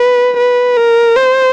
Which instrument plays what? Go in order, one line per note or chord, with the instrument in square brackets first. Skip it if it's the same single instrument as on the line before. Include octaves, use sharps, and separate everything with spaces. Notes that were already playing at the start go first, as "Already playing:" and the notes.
Already playing: [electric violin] B4
B4
A#4
C5